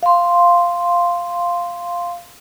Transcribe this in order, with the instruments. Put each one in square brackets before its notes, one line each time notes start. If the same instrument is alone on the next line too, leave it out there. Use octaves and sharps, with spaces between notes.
[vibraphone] F5 C6